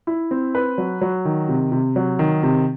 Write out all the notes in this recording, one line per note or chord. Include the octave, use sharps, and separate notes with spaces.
E4
C4
B4
F#3
F#3
D#3
C3
C3
F#3
D#3
C3